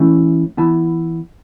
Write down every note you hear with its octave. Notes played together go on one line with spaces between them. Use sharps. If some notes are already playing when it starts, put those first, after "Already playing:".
Already playing: E3 A3 C#4 E4
E3 B3 E4 A5